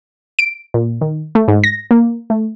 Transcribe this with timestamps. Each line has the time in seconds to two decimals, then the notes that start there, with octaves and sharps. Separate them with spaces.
0.39 D7
0.74 A#2
1.01 D#3
1.35 A3
1.48 G#2
1.64 A#6
1.91 A#3
2.30 A3